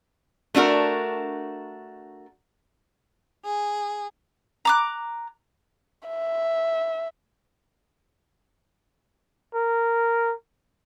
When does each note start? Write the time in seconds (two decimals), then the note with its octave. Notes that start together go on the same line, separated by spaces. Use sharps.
0.55 A3 D4 F#4 A#4
3.44 G#4
4.65 A#5 D6 F#6
6.09 E5
9.55 A#4